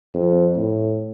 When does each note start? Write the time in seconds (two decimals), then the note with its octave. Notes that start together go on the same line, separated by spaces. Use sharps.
0.14 F2
0.57 A2